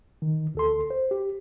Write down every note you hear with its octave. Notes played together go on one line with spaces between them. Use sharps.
D#3
D2 A4 C6
C5
G4